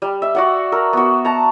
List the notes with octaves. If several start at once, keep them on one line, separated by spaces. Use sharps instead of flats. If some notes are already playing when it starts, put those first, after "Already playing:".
G3
E5
F#4 D5 F#5
A#4 E6
B3 F#4
A5 A#5